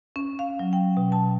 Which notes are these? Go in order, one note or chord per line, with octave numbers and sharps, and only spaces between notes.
C#4
F5
F#3
G5
B2
A5